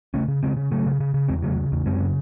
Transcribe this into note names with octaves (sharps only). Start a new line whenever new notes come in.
C#3 A3 C#4
C#3
C#3 G#3 C4
C#3
C#3 F#3 A3
C#3
C#3
C#3
E2 G#3 C4
C#3 F#3 A3
C#3
E2
F#2 G#3 C4
C#3